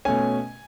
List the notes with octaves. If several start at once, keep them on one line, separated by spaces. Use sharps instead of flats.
B2 A3 C#4 G#5